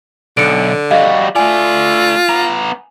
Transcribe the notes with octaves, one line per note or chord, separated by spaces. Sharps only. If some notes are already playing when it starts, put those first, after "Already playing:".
B1 D3 C#7 D7
G3 F#4 D#5 F5
A3 F4 D5 G#5
B3 A#5